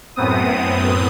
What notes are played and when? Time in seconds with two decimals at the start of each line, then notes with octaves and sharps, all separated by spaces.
0.16 F#2 A2 B3 C4 D#6